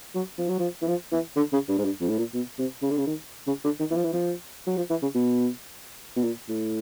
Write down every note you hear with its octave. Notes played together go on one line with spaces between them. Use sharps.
F#3
F3
F#3
F3
E3
F3
E3
D3
C#3
G2
G#2
G2
F2
A2
A#2
B2
C3
C#3
D3
C#3
D#3
C#3
D3
D#3
E3
F3
E3
F3
F#3
F3
E3
C#3
B2
B2
A#2
A2